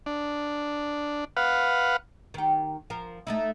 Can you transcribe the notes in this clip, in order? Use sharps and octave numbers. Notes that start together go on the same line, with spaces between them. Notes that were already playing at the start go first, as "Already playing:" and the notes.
D4
B4 F5 F#5
D#3 G4
F3 A#4
A3 D#4 E4